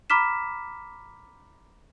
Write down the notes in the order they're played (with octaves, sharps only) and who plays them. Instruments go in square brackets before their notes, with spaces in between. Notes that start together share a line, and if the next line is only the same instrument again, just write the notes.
[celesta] A#5 B5 D6 F6 B6 E7